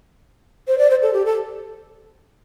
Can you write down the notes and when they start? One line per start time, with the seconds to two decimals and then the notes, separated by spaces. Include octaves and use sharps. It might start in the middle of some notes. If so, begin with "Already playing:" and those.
0.68 C5
0.78 D5
0.90 C5
1.02 A4
1.13 G4
1.25 A4